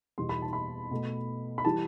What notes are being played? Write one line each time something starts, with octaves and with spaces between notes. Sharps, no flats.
E2 B2 G3 C6
B5
A5
B5
B2 A3
B5
E3 G3 A5